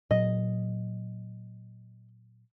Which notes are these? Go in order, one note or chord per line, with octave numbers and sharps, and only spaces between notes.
A#2 F#3 D#5